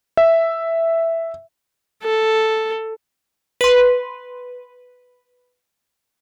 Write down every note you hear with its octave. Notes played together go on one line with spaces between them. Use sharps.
E5
A4
B4 C6